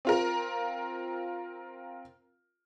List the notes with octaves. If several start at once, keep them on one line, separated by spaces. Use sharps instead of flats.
C4 F4 A#4